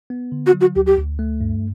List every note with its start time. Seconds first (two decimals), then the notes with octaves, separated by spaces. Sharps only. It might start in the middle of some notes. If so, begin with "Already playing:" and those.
0.10 B3
0.32 D3
0.46 F#4
0.53 F#3
0.61 F#4
0.75 D2 G4
0.86 G4
0.98 D2
1.19 A3
1.41 G2